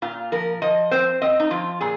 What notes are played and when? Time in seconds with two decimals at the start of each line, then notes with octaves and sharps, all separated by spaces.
0.02 A#2 F4
0.32 F3 A#4
0.62 F3 D#5
0.91 C4 C5
1.22 C4 D#5
1.40 D#4
1.51 F3 F4
1.81 A#2 G#4